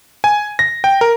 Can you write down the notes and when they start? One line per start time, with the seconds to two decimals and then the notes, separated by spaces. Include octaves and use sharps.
0.24 G#5
0.59 A#6
0.84 G5
1.01 A#4